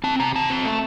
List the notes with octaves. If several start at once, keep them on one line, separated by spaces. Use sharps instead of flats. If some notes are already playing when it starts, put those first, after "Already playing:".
C4 A5
C3 A#5
C3 A5
C4
A3